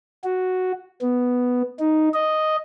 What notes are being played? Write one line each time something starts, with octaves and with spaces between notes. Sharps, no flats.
F#4
B3
D#4
D#5